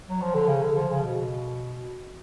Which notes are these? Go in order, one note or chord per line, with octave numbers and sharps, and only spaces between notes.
F#3
F3
D3
C#3
D3
F3
C#3
B2